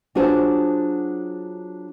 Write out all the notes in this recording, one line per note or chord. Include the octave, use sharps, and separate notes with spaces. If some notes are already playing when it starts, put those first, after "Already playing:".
F#3 D4 F4 F#4 G#4 C5